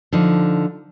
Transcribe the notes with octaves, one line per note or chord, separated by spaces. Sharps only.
D3 F3 D#4